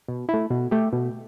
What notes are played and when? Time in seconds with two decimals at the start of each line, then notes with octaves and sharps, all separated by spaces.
0.08 B2
0.29 E4
0.34 A3
0.50 B2
0.71 A3 G4
0.93 B2